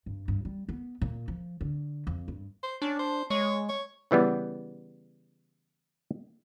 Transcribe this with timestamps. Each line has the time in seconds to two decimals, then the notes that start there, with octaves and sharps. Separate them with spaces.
0.06 G2
0.28 G2
0.45 G3
0.69 B3
1.02 A#2
1.28 F3
1.61 D3
2.07 F2
2.28 G2
2.63 C5
2.82 C#4 D4
2.99 C5
3.30 G#3 C#5
3.69 C#5
4.11 C#3 E3 G3 B3